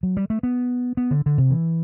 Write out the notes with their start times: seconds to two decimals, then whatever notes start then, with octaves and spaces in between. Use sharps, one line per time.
0.03 F#3
0.17 G3
0.30 A3
0.43 B3
0.97 B3
1.11 D3
1.26 D3
1.38 C3
1.51 E3